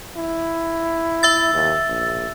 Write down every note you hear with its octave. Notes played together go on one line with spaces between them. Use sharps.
E4
E5 E6 A6
D#2
A#1